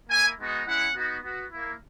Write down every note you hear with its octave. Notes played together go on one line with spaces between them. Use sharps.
A#3 E4 G#5
G#3 B3 D#4 F#4
G#3 C#4 E4 F#5
B3 D#4 F#4
B3 F#4
A#3 E4